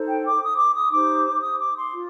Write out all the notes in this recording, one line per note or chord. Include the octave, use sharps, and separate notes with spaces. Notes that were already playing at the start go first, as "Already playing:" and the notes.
Already playing: D#4 A4 C5
G5
D6
D#6
D6
D#6
D#4 G4 C5 D6
D#6
D6
C6
F4